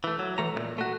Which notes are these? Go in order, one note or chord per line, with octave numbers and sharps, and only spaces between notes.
E3 A3
F#3
E3 A3 A#5
B1 A#2
A3 F#4